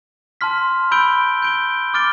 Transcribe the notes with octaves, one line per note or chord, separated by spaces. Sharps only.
A5 C6 F6 B6
B5 E6 G6 D7 G7
G6 D7 G7
D6 F6 A6 D7 G7